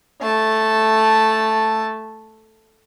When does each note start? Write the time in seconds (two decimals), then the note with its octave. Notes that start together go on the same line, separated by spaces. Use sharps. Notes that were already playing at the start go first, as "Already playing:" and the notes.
0.21 A3 A5